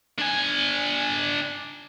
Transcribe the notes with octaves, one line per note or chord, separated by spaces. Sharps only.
D4 G#5